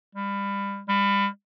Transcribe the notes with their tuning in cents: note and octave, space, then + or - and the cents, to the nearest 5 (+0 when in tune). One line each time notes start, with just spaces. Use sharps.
G3 +30
G3 +35